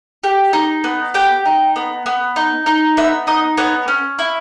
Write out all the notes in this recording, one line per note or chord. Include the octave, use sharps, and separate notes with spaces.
G4
D#4
B3
G4 G5
D#4
B3
B3
D#4
D#4
B3 E5
D#4 D#5
B3 C#5
C#4
E4